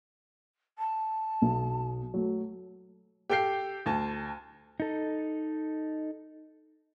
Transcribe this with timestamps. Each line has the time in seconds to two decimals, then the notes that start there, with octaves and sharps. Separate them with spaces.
0.79 A5
1.42 B1
2.14 F#3 A3
3.30 G4 A4 G5 G6 C7
3.86 D2 A5
4.80 D#4 A4